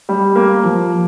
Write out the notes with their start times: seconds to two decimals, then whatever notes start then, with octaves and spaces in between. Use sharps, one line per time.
0.09 G3
0.36 A#3
0.64 F3